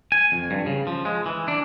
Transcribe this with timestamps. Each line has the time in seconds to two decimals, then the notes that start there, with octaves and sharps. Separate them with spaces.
0.12 G#5
0.32 F2
0.51 G2
0.66 C#3
0.87 F3
1.05 G#3
1.26 E3
1.48 D4